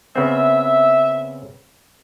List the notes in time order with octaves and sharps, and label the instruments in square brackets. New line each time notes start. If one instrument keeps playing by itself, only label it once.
[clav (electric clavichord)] C#3 B3 C4 [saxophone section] E5